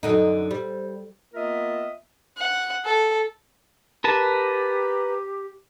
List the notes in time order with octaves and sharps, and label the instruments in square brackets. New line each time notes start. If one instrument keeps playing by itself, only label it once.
[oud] F#2 D3 D#4 [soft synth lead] A4
[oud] G3 [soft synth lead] C5
[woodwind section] A#3 B3 F4 A#4 D#5 E5
[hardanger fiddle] F#5
A4
[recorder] G4 [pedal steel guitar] A#4 B4 A5